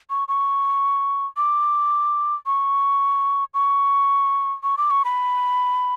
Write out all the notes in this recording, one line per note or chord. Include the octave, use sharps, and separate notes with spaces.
C#6
C#6
D6
C#6
C#6
C#6
D6
C#6
B5